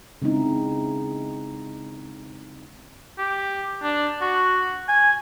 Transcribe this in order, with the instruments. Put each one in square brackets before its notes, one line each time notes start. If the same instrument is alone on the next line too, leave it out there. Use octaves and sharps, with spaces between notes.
[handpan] C#3 G#3 C4 D#4 E4
[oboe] G4
D4
F#4
G#5